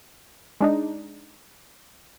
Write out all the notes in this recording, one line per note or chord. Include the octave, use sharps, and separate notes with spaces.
G#3 D4 D#4